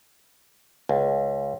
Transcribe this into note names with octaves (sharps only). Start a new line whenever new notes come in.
C#2